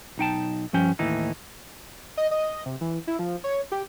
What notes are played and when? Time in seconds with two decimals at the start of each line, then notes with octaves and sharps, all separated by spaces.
0.18 B1 D#4 G5 A5
0.73 G2 F3 C#4 G5
0.99 D#2 A2 E3 D#4
2.17 D#5
2.31 D#5
2.66 C3
2.81 E3
3.07 E4
3.19 F3
3.44 C#5
3.72 G4